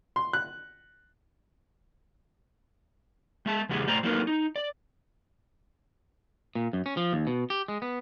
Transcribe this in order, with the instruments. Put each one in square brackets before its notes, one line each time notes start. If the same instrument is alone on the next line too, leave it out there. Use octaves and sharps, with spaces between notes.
[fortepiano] C6
F#6
[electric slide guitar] G#3 E5 A5
E2 C#3 G#3 G4 G#4
A2 A3 C5 D5 G5 A#5
F#3 A3 A#3 D#4 A#4 B4
D#4
D5
[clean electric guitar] A#2
F#2
C#4
F3
D#2
B2
G4
G#3
B3